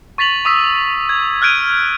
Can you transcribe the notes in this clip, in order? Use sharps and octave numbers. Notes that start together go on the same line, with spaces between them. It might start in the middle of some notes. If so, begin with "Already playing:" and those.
C#6 A6 B6 F7 F#7
C#6 D#6 E6 B6
G#6
F6 F#6 G#6 D7 D#7